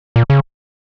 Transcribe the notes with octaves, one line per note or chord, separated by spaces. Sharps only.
A#2
C#3